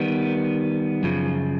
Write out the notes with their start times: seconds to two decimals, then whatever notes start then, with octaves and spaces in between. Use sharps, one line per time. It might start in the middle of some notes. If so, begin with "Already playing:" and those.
Already playing: D#3 G3 B3
1.03 F#2 C#3 F3